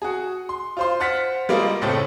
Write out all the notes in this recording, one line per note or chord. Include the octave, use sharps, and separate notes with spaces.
F#4 G#4
C6
F4 C5 C6
C5 F#5 F6 A6 B6
G3 G#3 A#3 F4 A#4
F#1 A2 A3 C4 C#5 A6